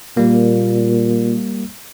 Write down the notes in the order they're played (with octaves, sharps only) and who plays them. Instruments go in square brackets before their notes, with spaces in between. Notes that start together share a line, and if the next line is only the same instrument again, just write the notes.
[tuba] A#2 [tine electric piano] G3 A#3